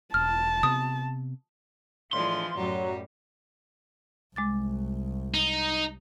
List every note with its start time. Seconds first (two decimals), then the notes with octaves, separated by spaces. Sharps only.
0.14 E1 A5 F6
0.63 C3 B3 D#6
2.13 A2 E3 F3 G#3 D4 C5 F5 C6
2.57 F#2 A2 F#3 G3 A#5
4.36 C2 G#3 D6 A6
5.34 D#4